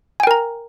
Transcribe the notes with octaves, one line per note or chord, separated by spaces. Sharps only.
A#4 G5 G#5 A#5